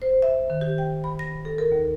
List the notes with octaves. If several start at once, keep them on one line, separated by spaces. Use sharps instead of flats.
C5
E5
D#3
G4
G5
B5
A#6
A4
A#4
D#2